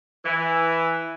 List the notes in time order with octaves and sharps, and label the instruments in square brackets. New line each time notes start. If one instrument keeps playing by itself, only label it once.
[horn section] E3